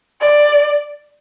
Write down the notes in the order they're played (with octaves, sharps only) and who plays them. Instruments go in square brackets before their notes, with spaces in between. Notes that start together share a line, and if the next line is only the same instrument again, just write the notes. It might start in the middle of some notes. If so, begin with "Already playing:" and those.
[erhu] D5